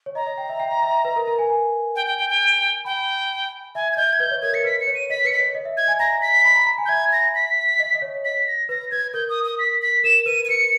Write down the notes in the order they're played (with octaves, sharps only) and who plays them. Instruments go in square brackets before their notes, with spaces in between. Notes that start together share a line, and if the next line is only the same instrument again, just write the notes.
[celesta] C#5
[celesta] D#5 [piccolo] A#5
[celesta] D#5
G5
E5
G5
G5
E5
B4
A#4
A#4
G#5
G#5
[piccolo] G5
G5
G5
G5
[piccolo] G5 [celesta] B5
[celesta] E5 [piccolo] G#5
[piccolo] G#6
[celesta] D#5 [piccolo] G6
[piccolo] G#6
[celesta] B4 [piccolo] G6
[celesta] C#5
[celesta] A#4 [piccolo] G#6
[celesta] A#4 [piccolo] C#7
[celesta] B4 [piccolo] B6
[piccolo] C#7
[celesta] C#5
[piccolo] D#7
[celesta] D#5 [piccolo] B6
[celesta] B4 [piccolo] C#7
[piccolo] B6
[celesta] C#5
D#5
E5
[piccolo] G#6
[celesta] G#5
[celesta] A#5 [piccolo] A#6
[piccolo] B6
[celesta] B5
A#5
A#5
G#5
[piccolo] G6
[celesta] E5 [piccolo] G#6
[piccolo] A#6
B6
[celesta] D#5
D#5
C#5
[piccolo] B6
A#6
[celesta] B4 [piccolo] A#6
[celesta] B4 [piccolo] G#6
[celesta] A#4 [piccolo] G6
[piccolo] D#6
D#6
B6
B6
[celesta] A#4 [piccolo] E7
[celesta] B4 [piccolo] D#7
[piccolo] D#7
[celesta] B4 [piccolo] C#7